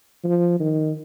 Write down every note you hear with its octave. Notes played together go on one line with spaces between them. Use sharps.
F3
D#3